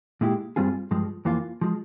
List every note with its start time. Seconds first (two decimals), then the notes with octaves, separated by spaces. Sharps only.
0.21 A#2 G#3 E4 G4
0.56 G2 G3 C4 F4 G#4
0.91 G2 F3 G#3
1.25 F2 E3 A#3 F4
1.61 F3 G#3